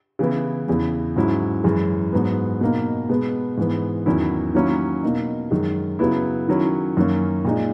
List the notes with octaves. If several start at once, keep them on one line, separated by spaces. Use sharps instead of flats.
C#3 E3 B3 E4
E2 C#3 E3
G#2 F#3 C#4 E4
F#2 E3 G#3
G#2 F#3 B3
B2 A#3 D#4
B2 G#3 B3
G#2 E3 B3
E2 D#3 F#3 C#4 E4
D#3 F#3 A#3 C#4 E4
B2 A#3 D#4
F#2 D#3 G#3
C#3 F#3 B3 E4
D#3 F#3 C#4 E4
F#2 D#3 A#3 C#4
A#2 G#3 D#4